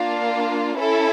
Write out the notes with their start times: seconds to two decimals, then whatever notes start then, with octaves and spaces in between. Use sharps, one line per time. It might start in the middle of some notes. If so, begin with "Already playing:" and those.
Already playing: A#3 D4 F4
0.76 C#4 E4 A4 B4